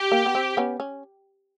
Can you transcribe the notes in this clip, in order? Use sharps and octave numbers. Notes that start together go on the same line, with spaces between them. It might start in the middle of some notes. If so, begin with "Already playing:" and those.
Already playing: G4
A#3
B3
C4
B3 C#4
C#4